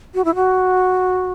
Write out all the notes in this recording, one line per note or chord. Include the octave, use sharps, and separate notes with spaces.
F#4
E4
F#4